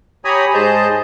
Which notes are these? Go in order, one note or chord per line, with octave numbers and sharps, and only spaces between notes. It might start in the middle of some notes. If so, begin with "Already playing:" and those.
G4 C#5 G#5 A#5 B5 D#6
G#2 G#4 C5 D#5 A5 G6